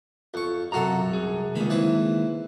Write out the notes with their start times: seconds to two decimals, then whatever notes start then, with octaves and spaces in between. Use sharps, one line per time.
0.34 F2 C#6
0.72 F#2 C3 F#4 A4 F5 A#5
1.11 C2 G#4
1.56 C#2 D#3 G#3 A#3 B5
1.70 E3 C4 B4